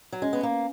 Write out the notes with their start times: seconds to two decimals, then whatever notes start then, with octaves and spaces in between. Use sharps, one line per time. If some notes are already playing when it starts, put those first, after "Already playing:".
0.12 F#3
0.22 G#3 C#4
0.33 B3
0.43 A#3